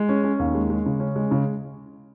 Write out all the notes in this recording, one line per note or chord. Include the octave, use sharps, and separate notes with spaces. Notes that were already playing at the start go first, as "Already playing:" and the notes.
Already playing: G#3
C#4
C#4
D#2
G#3
G#3
C#3
C#4
G#3
C#3